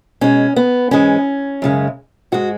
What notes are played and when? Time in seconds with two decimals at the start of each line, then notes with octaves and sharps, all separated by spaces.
0.21 B2 G#3 C#4
0.56 B3
0.91 G#2 E3 G#3 C#4
1.62 F#2 C#3 G#3
2.32 G#2 G#3 F#4